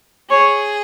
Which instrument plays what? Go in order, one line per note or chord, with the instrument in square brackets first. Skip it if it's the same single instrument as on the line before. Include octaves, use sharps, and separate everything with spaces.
[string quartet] G#4 [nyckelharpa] C#5